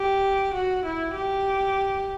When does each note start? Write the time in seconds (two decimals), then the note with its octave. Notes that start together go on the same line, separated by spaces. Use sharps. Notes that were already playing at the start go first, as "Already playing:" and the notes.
Already playing: G4
0.54 F#4
0.85 E4
1.15 G4